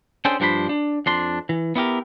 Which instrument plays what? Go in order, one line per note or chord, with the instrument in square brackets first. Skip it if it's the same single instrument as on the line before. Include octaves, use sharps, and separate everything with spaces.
[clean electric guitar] C#4 D4 G#4 A4 C5 G5
G2 F3 D4 C5 B5
D4
F2 D4 C6
E3
B3 E4 G4 A#4